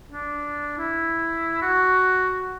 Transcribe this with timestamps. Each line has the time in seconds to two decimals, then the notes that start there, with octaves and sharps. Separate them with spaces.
0.12 D4
0.78 E4
1.62 F#4